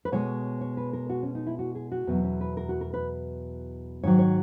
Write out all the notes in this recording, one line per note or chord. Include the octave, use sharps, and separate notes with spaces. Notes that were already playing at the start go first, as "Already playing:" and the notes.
B4
B2 G#3 C#5
C#5
B4
A#4
F#4
C#4
D#4
E4
F#4
G#4
F#4
E2 B2 F#3 B3
C#4
B4
A#4
F#4
A#4
B4
G#2 D#3 F#3 C#5
C#5